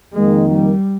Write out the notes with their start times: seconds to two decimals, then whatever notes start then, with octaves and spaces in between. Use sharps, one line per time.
0.13 F2 D#3 G#3 A#3
0.50 G3